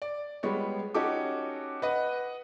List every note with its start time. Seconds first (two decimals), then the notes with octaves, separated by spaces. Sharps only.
0.02 D5
0.43 G3 G#3 B3 C#5
0.94 C#4 D#4 F#4 G4 A4 D6
1.82 B4 D#5 F#5